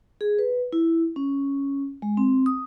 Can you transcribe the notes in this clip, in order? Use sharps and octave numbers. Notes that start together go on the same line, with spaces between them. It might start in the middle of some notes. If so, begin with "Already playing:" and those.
G#4
B4
E4
C#4
G#3
C4
D#6